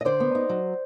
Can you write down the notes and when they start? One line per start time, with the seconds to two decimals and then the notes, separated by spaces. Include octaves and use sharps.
0.01 D#5
0.05 D3 C5 D5
0.20 B3
0.35 D#4
0.49 F#3